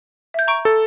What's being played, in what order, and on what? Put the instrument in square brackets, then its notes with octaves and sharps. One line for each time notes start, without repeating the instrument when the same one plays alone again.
[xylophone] E5 G6
A#5 C#6 D7
[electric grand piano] A4